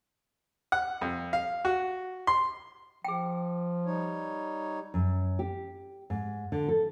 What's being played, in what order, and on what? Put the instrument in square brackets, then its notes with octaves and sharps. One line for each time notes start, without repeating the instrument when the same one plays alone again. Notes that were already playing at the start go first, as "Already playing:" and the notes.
[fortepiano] F#5
F2
F5
F#4
C6
[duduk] F3 [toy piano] G#4 G5
[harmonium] G3 D#4 C#5
[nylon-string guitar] F#2
G4
G#2
D3
A4